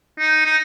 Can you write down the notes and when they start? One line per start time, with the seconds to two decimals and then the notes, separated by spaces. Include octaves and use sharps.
0.19 D#4
0.46 D#4